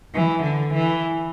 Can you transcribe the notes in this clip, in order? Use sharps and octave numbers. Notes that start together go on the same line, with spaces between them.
E3
D3
E3